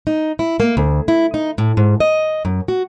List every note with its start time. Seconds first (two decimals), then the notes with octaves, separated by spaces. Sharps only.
0.07 D#4
0.39 E4
0.60 A#3
0.77 D2
1.08 E4
1.34 D#4
1.58 A2
1.77 G#2
2.00 D#5
2.45 F#2
2.68 F#4